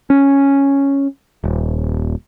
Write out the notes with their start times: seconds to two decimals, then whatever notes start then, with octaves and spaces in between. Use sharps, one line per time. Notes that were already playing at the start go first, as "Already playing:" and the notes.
0.10 C#4
1.44 D#1